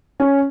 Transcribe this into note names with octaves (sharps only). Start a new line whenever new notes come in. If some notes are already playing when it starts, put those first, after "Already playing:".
C#4